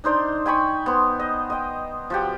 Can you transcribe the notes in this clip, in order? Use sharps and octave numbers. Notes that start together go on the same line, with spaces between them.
D4 D#4 C5 D5
G5 G#5 B5 C#6
B3 C5
D#5
D#5 G5
F3 F#4 G4